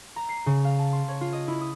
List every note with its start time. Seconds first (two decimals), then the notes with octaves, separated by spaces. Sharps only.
0.16 A#5
0.29 C7
0.46 C#3
0.65 F5
0.79 A5
0.93 C6
1.08 C#5
1.21 F4
1.33 D#5
1.48 E4
1.61 D#6